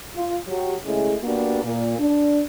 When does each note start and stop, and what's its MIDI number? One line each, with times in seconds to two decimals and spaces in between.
0.15 0.35 65
0.47 0.75 54
0.47 0.75 67
0.84 1.15 49
0.84 1.15 56
0.84 1.15 57
0.84 1.15 64
0.84 1.15 68
1.24 1.61 58
1.24 1.61 59
1.24 1.61 62
1.24 1.61 66
1.24 1.61 67
1.24 1.61 70
1.63 1.97 46
1.99 2.42 62